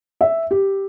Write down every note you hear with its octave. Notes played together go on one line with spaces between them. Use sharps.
E5
G4